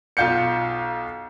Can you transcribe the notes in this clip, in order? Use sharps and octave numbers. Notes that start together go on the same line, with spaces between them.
B1 F4 F5 G6 C#7